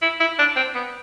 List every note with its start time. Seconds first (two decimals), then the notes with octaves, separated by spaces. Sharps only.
0.02 E4
0.20 E4
0.39 D4
0.56 C4
0.75 B3